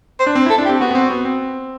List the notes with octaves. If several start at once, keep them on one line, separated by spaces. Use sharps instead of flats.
C5
D4
C4
E4
A4
D4
G4
C4
B3 F#4
B3
C4
B3
C4